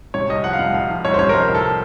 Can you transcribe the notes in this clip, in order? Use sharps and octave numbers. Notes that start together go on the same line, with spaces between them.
C3 C#5
C2 D#5
F3 F#5
F5
C2 F#5
C2 F5
F3
C2 C#5
C5
C3 C#5
A#4
F3 C5
C2
A4